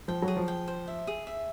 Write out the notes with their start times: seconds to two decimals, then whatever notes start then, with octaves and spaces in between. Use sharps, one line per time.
0.08 F3 G5
0.22 F#3
0.28 G#4
0.36 F3
0.48 G5
0.68 C5
0.88 E5
1.07 G#4
1.27 E5